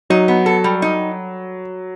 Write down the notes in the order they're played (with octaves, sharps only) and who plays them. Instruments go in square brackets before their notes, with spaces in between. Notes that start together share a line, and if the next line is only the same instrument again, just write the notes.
[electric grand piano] F#3 [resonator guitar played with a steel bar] D#4
[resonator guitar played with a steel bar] B3
A4
G3
D#4